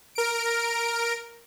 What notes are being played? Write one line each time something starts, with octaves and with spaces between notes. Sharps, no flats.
A#4 D7